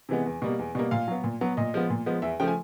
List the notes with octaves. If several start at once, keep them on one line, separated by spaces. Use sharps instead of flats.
C3 E3 G#3 B3
E2
B2 G3 A#3
E2
B2 G3 A#3
A#2 F5
F#3 B3
A#2
F#3 B3
A#2 D#5
F3 G#3 B3
A#2
F3 G#3 B3
E2 E5
C#3 F3 A3 G5
G#5